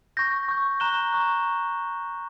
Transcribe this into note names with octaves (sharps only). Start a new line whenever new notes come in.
C#6 G6 A#6
C#6 G6
A#5 C#6 F#6 E7 G7
A#5 C#6 F#6